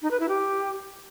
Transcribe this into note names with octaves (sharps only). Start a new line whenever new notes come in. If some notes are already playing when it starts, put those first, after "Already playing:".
D#4
B4
E4
G4